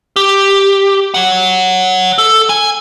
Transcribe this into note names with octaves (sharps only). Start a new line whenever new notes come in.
G4
C#5 F#5
A4
G#5